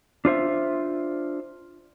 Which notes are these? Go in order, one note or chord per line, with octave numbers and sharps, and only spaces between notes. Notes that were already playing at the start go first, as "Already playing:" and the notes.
D4 F4 C5 E5